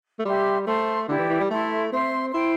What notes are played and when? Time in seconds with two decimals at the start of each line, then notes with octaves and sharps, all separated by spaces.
0.19 A3
0.25 G3 G4 E5 C6
0.67 A3 C5 A5 C6
1.09 D3 E4 G4 D5 G5
1.18 E3
1.29 E3
1.40 G3
1.50 A3 E4 A4 E5 C6
1.92 C4 C5 E5 C6
2.33 E4 C5 G5 C6